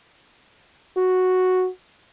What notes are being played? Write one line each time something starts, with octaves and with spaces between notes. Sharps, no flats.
F#4